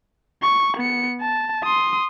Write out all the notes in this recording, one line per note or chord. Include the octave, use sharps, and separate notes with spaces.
C#6
B3 C#7
A5
C6 D#6